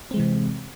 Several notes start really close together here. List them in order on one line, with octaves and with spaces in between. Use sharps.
C4 G#3 E3 C3